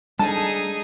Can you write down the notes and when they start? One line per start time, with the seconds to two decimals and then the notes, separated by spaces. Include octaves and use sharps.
0.19 G3 G#3 D4 D#4 G#4 A4 A5